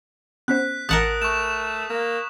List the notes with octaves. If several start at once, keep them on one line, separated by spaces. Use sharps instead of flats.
B3 C#4 C5 F#6 B6
A1 A#4 F#5 A5 D#6 F#6
A3 C#6 E7
A#3